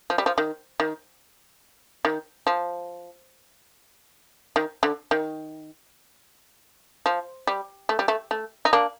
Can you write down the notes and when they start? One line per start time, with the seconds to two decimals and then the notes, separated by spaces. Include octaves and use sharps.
0.10 F3
0.18 G3
0.26 F3
0.38 D#3
0.80 D#3
2.05 D#3
2.47 F3
4.56 D#3
4.83 D3
5.11 D#3
7.06 F3
7.47 G3
7.89 A3
7.99 G3
8.08 A3
8.31 A3
8.65 D#4
8.73 A#3 D4